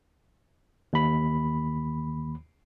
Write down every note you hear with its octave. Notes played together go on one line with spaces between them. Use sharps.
D#2 B5